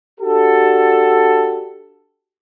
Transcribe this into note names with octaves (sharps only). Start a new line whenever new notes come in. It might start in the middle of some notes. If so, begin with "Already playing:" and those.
D4 F#4 G4 A4